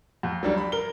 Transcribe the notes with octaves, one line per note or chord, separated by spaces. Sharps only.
F2
F#3 G3 D4
B5
A#4 G7